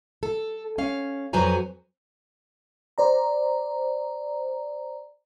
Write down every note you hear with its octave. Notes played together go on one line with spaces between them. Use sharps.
A4
C#4 F5
F2 F#3 B4 C5 G#5 A#5
C5 D5 A#5